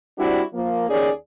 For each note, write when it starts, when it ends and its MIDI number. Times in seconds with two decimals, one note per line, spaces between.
0.18 0.42 55
0.18 0.42 60
0.18 0.42 62
0.18 0.42 64
0.18 0.42 66
0.53 0.87 53
0.53 0.87 58
0.89 1.11 39
0.89 1.11 61
0.89 1.11 68
0.89 1.11 74